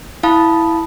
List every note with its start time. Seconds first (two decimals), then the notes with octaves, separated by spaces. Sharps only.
0.23 E4 F5 A5 B5 D#6